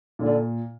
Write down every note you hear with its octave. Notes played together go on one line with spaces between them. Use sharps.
A#2 D3